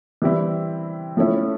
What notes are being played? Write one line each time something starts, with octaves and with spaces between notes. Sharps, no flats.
E3 G3 C4 E4
F3 A3 C#4 E4